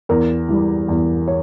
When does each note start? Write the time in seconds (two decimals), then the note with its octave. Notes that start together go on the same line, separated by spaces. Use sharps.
0.09 E2 A#4
0.49 E3 G3
0.88 E2
1.28 C#5